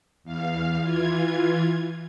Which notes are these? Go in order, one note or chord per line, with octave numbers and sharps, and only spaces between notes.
E2 F5
E3 F4 G#6